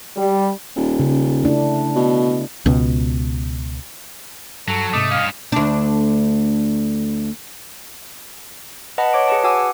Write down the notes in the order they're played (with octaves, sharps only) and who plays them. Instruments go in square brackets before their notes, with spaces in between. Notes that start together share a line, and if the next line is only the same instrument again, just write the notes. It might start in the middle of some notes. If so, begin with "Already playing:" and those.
[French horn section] G3
[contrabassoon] D#1
[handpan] C#3
A3 D4 E4
[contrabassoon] B2
[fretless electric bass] C#2 B2
[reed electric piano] G2 [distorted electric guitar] F#3 [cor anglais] A4
[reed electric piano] G#2 C3 D6 [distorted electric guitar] A3 [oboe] D#5
[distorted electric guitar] G2 C#4 [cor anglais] F5
[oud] D2 D4
[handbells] B4 D#5 F#5 A5 B5
C#5 D6 D7
G#4 B4 A5
F#4 F#5 G#5 D6 E6